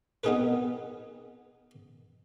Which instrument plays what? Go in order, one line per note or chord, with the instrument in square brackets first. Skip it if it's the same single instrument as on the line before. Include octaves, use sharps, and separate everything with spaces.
[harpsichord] B3 C4 D#4 G#4 A#4 B4